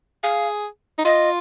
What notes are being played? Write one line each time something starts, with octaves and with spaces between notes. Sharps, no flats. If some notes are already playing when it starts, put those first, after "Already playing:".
G#4 F5
D#4
F4 D#5